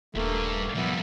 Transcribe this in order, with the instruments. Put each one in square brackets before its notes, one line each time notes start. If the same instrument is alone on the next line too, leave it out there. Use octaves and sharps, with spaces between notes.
[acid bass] D#1 [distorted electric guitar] C#2 G2 [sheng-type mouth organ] A3 A#3
[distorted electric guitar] F2 G3 [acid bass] A#2 [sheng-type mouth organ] B3 E5